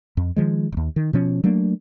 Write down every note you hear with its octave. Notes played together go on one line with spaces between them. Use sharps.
F2
D#3 F3 G#3
D#1 D#2
D#3
B2 F3 C#4
F#3 A3 A#3 D4